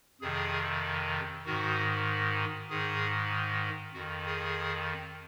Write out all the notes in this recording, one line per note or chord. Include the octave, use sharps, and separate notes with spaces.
F2 C3 D#3 G#4
G#2 D#3 F#4
G#2 D#3 G#4
F2 D#3 F#4
G#4